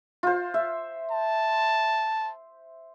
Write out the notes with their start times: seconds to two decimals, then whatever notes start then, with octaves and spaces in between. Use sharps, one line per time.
0.23 F4 C5
0.54 E5
1.11 A5